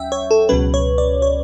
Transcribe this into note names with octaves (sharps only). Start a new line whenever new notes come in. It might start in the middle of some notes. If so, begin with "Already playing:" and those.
Already playing: D2 F#3 C#4 E5 F#5 G5
C#5
A4
C#2 B2 F#3 C#4 B4
C#5
D5
C#5